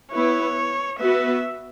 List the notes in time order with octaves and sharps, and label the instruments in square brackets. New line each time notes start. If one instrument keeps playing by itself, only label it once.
[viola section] B3 E4 B4 [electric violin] C#5
[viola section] B3 F#4 B4 [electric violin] E5